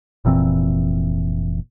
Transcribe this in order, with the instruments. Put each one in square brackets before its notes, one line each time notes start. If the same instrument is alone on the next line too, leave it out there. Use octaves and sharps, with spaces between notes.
[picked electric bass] F1 A#2 E3 C4